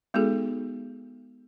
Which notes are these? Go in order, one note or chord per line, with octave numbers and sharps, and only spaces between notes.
G#3 B3 D#4 F#4 G#4 A4